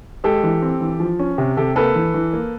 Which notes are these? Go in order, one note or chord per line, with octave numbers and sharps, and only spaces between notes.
G#3 G4 A4
E3
C4
E3
F3
C#4
C3
C3 G4 A4
A#3 A4 B4
E3
E3
A#3